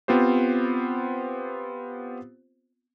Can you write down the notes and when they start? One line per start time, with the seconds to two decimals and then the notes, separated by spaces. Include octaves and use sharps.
0.08 B3 C4 F4 G4 C5